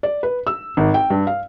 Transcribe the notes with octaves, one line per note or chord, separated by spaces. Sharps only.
D5
B4
E6
G#1
G5
G2
F5